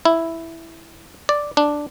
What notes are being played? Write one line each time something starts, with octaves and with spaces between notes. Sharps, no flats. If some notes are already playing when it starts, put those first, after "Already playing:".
E4
D5
D4